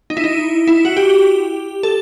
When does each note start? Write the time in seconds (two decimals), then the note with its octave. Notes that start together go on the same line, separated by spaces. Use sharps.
0.10 D#4
0.17 E4
0.24 D#4
0.67 E4
0.85 F#4
0.97 G4
1.83 A4